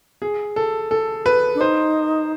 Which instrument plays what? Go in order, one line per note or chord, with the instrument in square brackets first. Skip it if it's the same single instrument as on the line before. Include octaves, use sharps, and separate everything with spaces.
[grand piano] G#4
A4
A4
B4
[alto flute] D4
[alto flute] D#4 [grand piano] C5